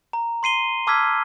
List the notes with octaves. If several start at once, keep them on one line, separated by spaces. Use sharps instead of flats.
A#5
C6 C7 D#7 G7
A5 D6 E6 F6 G#6 B6